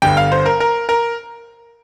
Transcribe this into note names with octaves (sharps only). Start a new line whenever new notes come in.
G1 G2 D3 G5
F5
C5
A#4
A#4
A#4